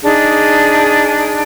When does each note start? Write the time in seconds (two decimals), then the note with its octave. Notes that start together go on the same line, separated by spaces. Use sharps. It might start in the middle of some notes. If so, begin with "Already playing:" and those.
0.03 D4 D#4 G#4